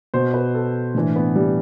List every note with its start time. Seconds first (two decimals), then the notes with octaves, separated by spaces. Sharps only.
0.14 B2 C5
0.34 B4
0.54 A4
0.94 A2 E3 D4
1.16 B3
1.36 G3